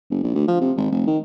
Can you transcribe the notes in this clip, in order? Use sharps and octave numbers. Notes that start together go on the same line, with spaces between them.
F#1
A#1
D2
F3
C3
G#1
F1
D#3